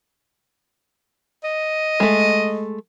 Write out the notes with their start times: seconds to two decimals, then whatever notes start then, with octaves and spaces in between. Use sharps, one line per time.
1.44 D#5
2.00 G#3 A3